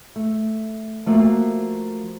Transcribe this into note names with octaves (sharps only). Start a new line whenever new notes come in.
A3
F3 A3 A#3 F#4